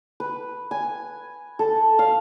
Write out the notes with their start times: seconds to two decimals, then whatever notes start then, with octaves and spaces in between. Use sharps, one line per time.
0.20 B4
0.71 G#5
1.59 A4
1.99 F5